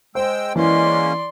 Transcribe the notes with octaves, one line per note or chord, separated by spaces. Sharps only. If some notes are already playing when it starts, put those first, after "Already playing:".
G#3 C5 G5 E6
E3 G#3 A#3 C#4 D5 C6